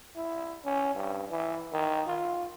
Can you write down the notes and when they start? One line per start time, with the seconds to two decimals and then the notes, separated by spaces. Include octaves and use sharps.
0.16 E4
0.65 C#4
0.95 G2
1.31 E3
1.73 D#3
2.07 F4